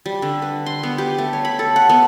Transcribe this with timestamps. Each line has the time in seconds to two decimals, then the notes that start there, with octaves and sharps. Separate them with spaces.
0.06 G3
0.22 D3
0.42 B4
0.66 C6
0.83 B3
0.98 G4
1.18 A3
1.33 C#5
1.45 B5
1.59 A4
1.76 F#5
1.89 B3